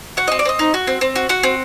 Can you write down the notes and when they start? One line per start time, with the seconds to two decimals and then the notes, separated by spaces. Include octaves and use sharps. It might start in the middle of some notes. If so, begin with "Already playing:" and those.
0.17 F#4 F#5
0.28 C4 D#5
0.39 D5
0.45 C4 D#5
0.59 D#4
0.74 F#4
0.87 C4
1.01 C4
1.16 F#4
1.29 F#4 F#5
1.43 C4